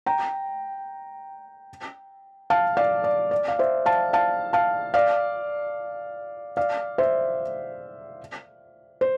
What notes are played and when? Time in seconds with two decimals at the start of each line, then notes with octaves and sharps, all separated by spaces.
0.06 G5 A#5
2.50 F5 A5
2.77 D5 F5
3.04 D5
3.31 D5
3.48 F5
3.59 C5 E5
3.86 F5 A5
4.13 F5 A5
4.53 F5 A5
4.94 D5 F5
6.57 D5 F5
6.98 C5 E5
9.01 C5